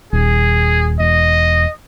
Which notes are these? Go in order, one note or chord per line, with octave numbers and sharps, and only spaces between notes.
D#1 G#4
E1 D#5